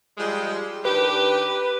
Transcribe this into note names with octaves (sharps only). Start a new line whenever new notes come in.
F3 G3 G#3
D#3 D4 G4 B4